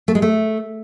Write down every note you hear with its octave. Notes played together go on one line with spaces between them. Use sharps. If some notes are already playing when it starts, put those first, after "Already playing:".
A3
G#3
A3